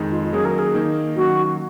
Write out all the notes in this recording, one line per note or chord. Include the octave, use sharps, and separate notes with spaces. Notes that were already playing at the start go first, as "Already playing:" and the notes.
Already playing: F2 D#3 G#3 D#4
F4
D#3 F#3 A#3 C#4 G#4
A#4
G#4
D#3 A#3 D#4
D#3 F#3 A#3 C#4 F#4